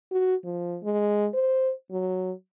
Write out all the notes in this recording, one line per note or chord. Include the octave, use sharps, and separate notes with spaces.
F#4
F3
G#3
C5
F#3